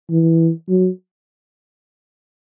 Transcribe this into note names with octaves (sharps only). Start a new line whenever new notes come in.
E3
F#3